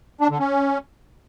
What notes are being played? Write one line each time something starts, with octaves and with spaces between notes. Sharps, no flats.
D4
D3
C#4